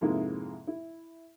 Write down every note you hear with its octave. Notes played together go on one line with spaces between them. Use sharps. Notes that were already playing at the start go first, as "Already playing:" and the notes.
F2 G#2 C3 G#3 A#3 E4
E4